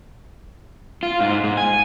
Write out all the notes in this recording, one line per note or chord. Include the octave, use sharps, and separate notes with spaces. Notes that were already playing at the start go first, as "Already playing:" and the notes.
F4
G#2
G#2
G#5